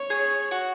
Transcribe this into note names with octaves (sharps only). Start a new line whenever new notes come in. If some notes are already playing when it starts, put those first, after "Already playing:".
Already playing: C#5
G#4
F#4